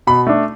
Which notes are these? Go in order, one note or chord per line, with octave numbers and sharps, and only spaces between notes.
B2 B5
A3 D4